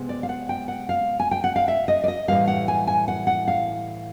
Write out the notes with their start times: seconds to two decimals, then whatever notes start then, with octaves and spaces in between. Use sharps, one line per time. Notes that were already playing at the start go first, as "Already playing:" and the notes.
Already playing: C3 G#3 B3
0.09 D5
0.23 F5
0.29 F#5
0.49 G5
0.68 F#5
0.89 F5
1.20 G#5
1.31 G5
1.44 F#5
1.56 F5
1.68 E5
1.88 D#5
2.04 D5
2.08 D#5
2.28 A2 E3 G3 F5
2.48 F#5
2.68 G#5
2.87 G#5
3.08 F#5
3.27 F#5
3.48 F5